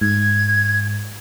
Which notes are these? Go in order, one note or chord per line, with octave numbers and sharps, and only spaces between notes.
G#2 G#6